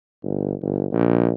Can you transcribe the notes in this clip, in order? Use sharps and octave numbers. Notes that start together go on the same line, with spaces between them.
G1
G1
A#1